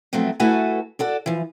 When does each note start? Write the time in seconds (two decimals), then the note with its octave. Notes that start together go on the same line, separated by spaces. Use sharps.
0.13 F3 F#3 A3 B3 C4
0.40 A3 E4 F#4 A4 B4 G#5
0.99 F#4 A4 D5
1.26 E3 F3